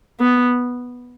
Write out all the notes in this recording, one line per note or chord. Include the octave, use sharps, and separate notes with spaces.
B3